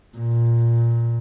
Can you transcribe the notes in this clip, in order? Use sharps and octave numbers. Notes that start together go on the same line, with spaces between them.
A#2